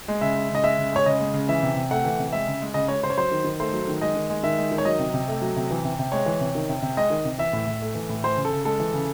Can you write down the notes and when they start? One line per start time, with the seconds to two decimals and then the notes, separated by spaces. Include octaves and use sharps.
0.08 G#3
0.21 C#3 E5
0.36 G#3
0.50 C#3
0.55 D#5
0.63 G#3 E5
0.78 C#3
0.92 G#3 C#5
1.06 C#3 D#5
1.20 G#3
1.34 C#3
1.49 E3 E5
1.63 C3
1.76 C3
1.91 A3 F#5
2.05 E3
2.19 C3
2.32 G#3 E5
2.47 C#3
2.61 G#3
2.74 C#3 D#5
2.88 G#3 C#5
3.03 C#3 C5
3.10 C#5
3.17 F#3 C5
3.32 D#3
3.45 D#3
3.60 A3 C5
3.73 F#3
3.88 D#3
4.01 G#3 D#5
4.16 D#3
4.30 G#3
4.43 D#3 E5
4.58 G#3
4.71 D#3
4.78 C#5
4.85 F#3 D#5
4.99 C3
5.14 C3
5.28 A3
5.41 F#3
5.56 C3
5.71 E3
5.85 C3
5.99 C3
6.12 G#3 C#5
6.26 E3
6.41 C3
6.55 D#3
6.69 C3
6.82 C3
6.97 G#3 D#5
7.10 D#3
7.25 C3
7.38 E3 E5
7.53 A2
7.67 A2
7.82 A3
7.95 E3
8.09 A2
8.24 E3 C5
8.37 C#3
8.45 A4
8.52 C#3
8.65 G#3 A4
8.80 E3
8.93 C#3